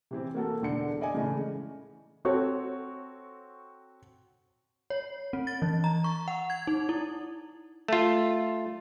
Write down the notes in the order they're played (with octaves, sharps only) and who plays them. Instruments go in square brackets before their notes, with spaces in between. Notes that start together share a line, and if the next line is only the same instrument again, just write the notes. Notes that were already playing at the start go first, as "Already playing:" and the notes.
[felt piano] C3 E3 C4
A#3 F#4 A4
E1 D3 C#7
D5 D#5 G#5
A2 C#3 E3 G#3 A3
C4 F#4 A4 C#5
[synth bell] C#5
C4
A6
E3
A#5
C#6
F#5
G#6
D#4
E4
[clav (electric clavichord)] A3 F4